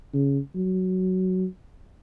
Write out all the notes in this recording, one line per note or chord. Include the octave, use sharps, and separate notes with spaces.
C#3
F#3